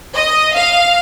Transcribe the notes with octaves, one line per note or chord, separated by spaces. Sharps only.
D#5
F5